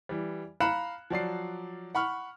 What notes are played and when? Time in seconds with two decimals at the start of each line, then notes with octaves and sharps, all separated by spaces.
0.09 E3 G3
0.60 F5 A#5 B5 F#6 C#7 E7
1.10 F3 F#3 D5 C7
1.95 F#5 B5 C#6 F6